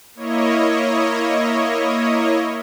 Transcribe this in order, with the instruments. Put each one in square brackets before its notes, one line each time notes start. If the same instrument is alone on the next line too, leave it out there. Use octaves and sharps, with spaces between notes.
[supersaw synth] A#3 E4 C#5 D#5